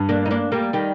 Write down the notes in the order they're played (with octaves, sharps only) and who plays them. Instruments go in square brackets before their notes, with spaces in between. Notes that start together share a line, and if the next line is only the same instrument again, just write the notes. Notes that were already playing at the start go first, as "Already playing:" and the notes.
Already playing: [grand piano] G2
[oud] A#3 D4
D#4
A#3 D4
G3 A#3
D#3 G3